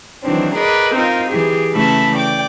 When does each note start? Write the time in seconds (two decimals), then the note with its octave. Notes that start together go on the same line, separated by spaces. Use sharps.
0.23 D#3 E3 F#3 C4 D4
0.54 G#4 A#4 B4 D5 D#5
0.93 C4 D#4 F4 A#4
1.29 E3 G4 G#4
1.72 C#3 E3 A3 E5 A5 B5
2.15 D5 G5 D6